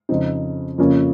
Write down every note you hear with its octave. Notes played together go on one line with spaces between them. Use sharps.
F2 C#3 F3 C4 D#4
F2 C#3 F3 A#3 C#4